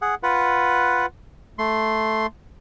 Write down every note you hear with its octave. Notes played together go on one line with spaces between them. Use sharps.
G#4 F#5
F4 B4 F#5
A3 C6